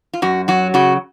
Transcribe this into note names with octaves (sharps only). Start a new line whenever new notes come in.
F4
F#2 F#4
F#3 F#4
C#3 F#4